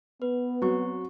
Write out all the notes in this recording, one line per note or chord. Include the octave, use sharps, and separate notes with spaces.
B3 B4
F#3 C4 F#4 C#6